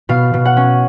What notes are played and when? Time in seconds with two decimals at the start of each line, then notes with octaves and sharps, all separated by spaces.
0.09 B2 F5
0.34 B2
0.45 F#5
0.57 C#4